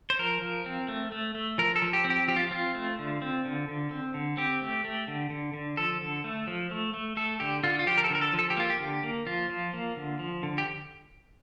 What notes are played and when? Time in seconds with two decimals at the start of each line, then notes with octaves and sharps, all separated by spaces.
0.10 C5
0.19 F3 A#4
0.42 F3
0.66 C4
0.88 A3
1.12 A3
1.35 A3
1.58 F3 A#4
1.76 A4
1.82 F3
1.93 G4
2.05 C4
2.10 G4
2.28 F3 G4
2.36 F4
2.51 C4 F4
2.75 A3
2.99 D3
3.22 C4
3.45 D3
3.68 D3
3.91 C4
4.14 D3
4.37 C4 G4
4.62 A3
4.85 A3
5.08 D3
5.30 D3
5.54 D3
5.77 F3 A4
6.01 D3
6.24 A3
6.47 F3
6.71 A3
6.94 A3
7.17 A3 A4
7.40 D3 G4
7.63 D3 F4
7.79 F4
7.87 F3 G4
7.97 A#4
8.04 A4
8.10 D3 A#4
8.21 A4
8.33 F3
8.39 A4
8.50 G4
8.57 A#3 F4
8.70 G4
8.80 D3
9.03 A#3
9.27 F3 F4
9.50 F3
9.73 A#3
9.96 D3
10.19 F3
10.43 D3
10.58 G4